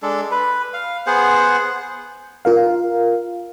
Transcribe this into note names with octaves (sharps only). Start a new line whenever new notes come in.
G#3 D4 A4
B4
F5
B3 G#4 C5 F#5
F4 A#4 F5